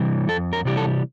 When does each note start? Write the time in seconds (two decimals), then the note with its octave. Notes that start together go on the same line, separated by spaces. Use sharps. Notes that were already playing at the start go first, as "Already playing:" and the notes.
Already playing: C3 E3 G3
0.28 F2 A4
0.53 A#4
0.65 C3 E3 G3 G4
0.77 A4